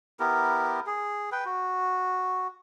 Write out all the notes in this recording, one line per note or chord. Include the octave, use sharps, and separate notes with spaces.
B3 E4 G4 A#4
G#4
B4 G5
F#4